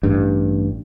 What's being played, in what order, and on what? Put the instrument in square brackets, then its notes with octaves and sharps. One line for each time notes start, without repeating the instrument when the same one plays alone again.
[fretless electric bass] A1 G2